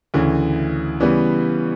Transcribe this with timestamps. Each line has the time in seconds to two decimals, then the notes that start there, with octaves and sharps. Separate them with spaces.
0.14 D2 C#3 E3
1.00 C#3 E3 G3 B3